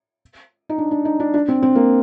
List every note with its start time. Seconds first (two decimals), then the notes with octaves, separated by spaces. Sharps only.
0.69 D#4
0.78 D4
0.91 D4
1.05 D#4
1.20 D4
1.34 D4
1.48 C4
1.62 C4
1.75 A#3